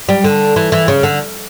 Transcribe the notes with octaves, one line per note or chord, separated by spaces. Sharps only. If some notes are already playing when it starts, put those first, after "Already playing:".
G3
D3
E3
E3
C#3
D3